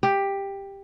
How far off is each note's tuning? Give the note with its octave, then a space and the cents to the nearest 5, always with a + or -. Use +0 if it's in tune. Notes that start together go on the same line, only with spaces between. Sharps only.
G4 +10